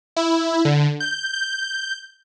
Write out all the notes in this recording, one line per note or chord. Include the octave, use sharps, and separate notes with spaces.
E4
D3
G6
G6